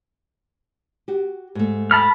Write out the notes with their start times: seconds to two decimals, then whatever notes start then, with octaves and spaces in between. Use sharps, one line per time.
1.08 F#4 G4
1.55 G#2 A3
1.91 A5 B5 F6